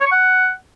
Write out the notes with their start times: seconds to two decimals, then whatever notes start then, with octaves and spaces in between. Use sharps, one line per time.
0.01 C#5
0.06 C#6
0.12 F#5